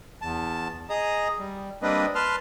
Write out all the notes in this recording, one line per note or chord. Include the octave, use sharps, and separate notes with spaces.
E2 A5
G#4 D#5 A#5 D#6
G3
G3 A#3 C4 D4 B4 D#5
B4 A5 C6 F6